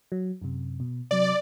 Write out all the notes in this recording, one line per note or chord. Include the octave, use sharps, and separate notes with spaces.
F#3
F#2 C3
B2
C3 F#3 D5